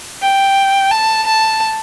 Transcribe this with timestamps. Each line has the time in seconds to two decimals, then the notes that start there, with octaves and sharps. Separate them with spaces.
0.22 G5
0.91 A5
1.26 A5